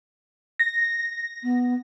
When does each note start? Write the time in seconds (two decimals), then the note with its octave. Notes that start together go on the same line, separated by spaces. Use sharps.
0.59 A#6
1.44 B3